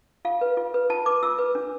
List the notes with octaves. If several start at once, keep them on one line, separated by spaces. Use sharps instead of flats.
F4 F5
B4
F4
B4
F4 A5
B4 D6
F4 E6
B4
D4